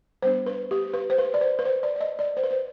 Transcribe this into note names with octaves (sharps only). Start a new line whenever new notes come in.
G3 B3 D4 C5
B4
G4
B4
C5
B4
D5
C5
B4
C5
D5
D5
D#5
D5
C5
B4
C5